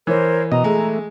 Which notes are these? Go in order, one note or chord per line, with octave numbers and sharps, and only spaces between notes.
E3 A#4 C5 C#5
B2 D#5 A#5
G#3 A3